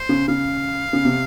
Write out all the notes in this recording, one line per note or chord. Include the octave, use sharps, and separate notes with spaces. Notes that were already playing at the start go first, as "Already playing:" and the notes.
Already playing: C5
C#3
C#3 F5
C#3
C3